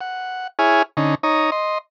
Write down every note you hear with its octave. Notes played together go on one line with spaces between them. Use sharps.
F#5
E4 G#4 C#5 G#5 F6
D3 C#4 D#4
D#4 C#5 A#5 D#6
D#5 C6